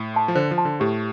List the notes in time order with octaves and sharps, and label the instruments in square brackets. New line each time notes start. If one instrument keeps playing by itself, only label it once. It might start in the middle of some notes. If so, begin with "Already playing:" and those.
Already playing: [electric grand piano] A2
[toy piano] A5 C6
[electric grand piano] F3
[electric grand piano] D3 [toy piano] C5
[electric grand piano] F3
[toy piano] A5 C6
[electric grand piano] D3
[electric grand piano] A2 [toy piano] G4